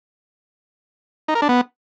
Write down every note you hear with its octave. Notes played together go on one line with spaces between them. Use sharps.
D#4
A#4
D4
B3